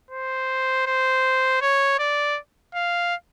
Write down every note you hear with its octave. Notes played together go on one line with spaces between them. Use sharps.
C5
C5
C#5
D5
F5